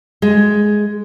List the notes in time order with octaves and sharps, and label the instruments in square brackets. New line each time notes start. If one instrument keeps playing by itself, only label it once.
[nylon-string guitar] G#3